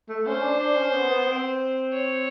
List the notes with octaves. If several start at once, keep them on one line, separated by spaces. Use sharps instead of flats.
A3
C#4 C5
D4
D4
C#4
B3
B3
C4
C#5